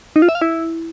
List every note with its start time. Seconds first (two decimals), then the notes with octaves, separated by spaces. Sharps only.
0.16 D#4
0.22 F4
0.29 E5
0.35 F5
0.41 E4